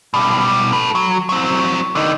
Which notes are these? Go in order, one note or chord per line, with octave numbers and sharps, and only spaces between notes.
B2 G3
A4 B4
F#3
F#3 C4
D3 D#4